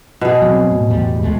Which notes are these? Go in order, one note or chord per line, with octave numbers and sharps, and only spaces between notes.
B2 G#4
F#3 A3 C4
A2
E2 A2 G3
C#2 G#3 A3